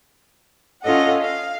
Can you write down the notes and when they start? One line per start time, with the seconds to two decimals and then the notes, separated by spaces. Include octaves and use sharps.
0.83 C#4 F4 A4 D#5 F#5
1.21 F5